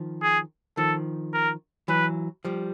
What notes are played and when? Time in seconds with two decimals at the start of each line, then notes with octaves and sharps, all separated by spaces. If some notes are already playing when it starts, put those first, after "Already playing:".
Already playing: D#3 F3
0.22 G#4
0.77 D#3 F3 A4
1.33 A#4
1.88 E3 F#3 B4
2.45 F3 G3